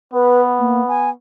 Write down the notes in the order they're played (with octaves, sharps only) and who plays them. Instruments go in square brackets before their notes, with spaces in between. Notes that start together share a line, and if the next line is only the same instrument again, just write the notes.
[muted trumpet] B3 [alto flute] B4
[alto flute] A#3
G#5